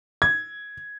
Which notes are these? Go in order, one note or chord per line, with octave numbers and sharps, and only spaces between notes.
G#6